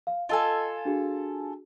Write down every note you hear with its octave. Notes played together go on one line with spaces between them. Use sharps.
F5
F4 A4 D#5 G#5 A5 E6
D4 F#4 G#4